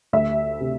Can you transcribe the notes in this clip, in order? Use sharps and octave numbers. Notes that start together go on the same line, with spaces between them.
D2 E5
C3